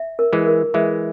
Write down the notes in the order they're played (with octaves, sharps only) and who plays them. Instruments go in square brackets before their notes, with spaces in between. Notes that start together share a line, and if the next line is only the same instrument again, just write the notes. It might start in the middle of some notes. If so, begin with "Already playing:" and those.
Already playing: [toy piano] E5
A#4
[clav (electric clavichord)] E3 G#3
[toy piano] A#4
[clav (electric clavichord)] E3 G#3 [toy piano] E5